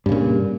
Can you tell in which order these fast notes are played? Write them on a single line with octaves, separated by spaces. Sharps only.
G2 C#3 A#2